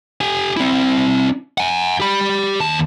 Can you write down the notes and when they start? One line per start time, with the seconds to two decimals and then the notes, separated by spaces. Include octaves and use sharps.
0.21 G4 G#5
0.57 C4 E4
1.58 F#5 G#5
2.00 G4 B5
2.60 D#2 A5